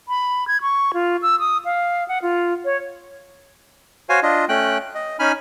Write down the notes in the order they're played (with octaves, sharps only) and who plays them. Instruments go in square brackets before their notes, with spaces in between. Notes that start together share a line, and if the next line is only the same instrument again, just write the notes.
[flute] B5
G#6
C#6
F4
E6
D#6
F5
F#5
F4
C#5
[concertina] F#4 C5 C#5 F5 G#5
D4 F4 D#5
A3 C#4 G5 F#6
D#5
C#4 D#4 G#5 B5 F6